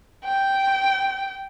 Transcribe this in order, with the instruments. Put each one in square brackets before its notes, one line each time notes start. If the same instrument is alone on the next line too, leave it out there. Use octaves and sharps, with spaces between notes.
[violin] G5